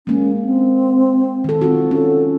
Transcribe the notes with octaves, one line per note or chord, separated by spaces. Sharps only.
G#3 A#3 C#4
C4
D#3 A4
C4 F4 F#4
C#4 A4